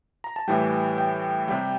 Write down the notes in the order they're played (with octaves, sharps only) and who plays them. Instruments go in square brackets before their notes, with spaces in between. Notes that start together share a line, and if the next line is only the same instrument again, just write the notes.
[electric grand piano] A#5
A5
A2 E3 G3 G5
G5
C3 G3 G5